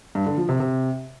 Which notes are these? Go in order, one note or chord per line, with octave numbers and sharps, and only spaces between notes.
G2
D3
F3
C3
C3